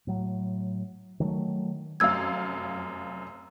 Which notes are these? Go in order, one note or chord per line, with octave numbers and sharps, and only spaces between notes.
A2 F#3
D#3 F#3 G#3 A3
F1 F#2 F5 E6 G#6